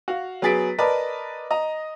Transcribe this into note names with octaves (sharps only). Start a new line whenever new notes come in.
F#4 F5
F#3 B3 G#4 A6 B6 D7
A#4 B4 D5 D#5 A5
D#5 A#5